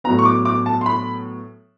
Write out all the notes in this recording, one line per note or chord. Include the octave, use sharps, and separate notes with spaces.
A2 F#3 B3 A#5
C#6
D6
D6
A5
C6
B5